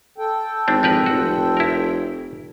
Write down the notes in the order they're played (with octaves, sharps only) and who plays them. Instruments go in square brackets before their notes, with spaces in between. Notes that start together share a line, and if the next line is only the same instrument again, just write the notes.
[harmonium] A4 G5
[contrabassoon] G#1 [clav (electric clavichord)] C4 D4
[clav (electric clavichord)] F3 A#4 B4
[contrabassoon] F1 [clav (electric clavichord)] F#4
[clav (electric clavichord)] E4 A#4